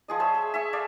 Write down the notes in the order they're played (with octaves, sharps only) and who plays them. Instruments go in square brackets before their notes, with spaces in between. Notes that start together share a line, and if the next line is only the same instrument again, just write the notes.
[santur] F3 G#4 D#5
G#4 C5 C#5 E5
G#4
E5 G#5 C#6
A4 D5 F5 G5